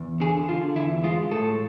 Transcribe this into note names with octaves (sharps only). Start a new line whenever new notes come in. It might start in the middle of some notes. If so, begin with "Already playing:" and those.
Already playing: E2
D3 G#4
D3 F4
E2 E4
G#3 F4
A2 A4